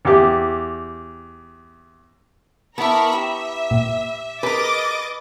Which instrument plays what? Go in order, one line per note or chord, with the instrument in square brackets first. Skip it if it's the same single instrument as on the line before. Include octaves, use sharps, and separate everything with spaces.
[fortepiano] E2 G4
[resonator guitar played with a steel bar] B3 E4 [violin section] A#4 B5 C#6 [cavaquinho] A5 D6
[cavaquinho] G4 A#5 [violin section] E5
[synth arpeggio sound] A#2
[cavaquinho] G#4 A#4 [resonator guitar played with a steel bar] B4 [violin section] D#5 D6 A6